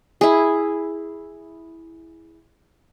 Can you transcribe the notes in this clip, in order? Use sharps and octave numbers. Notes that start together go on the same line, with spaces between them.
E4 G#4